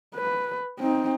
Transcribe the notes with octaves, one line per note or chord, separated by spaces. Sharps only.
B4
C4 D#4